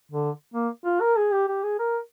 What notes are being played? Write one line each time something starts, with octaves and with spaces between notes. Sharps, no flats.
D3
A#3
F4
A#4
G#4
G4
G4
G#4
A#4